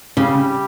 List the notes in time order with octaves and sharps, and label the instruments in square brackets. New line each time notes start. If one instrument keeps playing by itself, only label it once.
[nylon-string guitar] C#3 [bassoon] G3